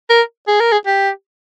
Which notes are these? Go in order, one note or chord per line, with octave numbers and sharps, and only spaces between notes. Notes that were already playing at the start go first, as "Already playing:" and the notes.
A#4
G#4
A#4
G#4
G4